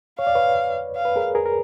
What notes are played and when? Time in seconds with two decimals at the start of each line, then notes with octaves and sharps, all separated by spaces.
0.19 C#5 F5
0.27 D5
0.35 B4 C#5
0.96 F5
1.05 B4
1.16 G#4 A#4
1.35 G#4 A#4
1.46 A#4